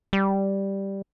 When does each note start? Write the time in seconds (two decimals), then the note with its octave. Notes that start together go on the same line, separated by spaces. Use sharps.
0.13 G3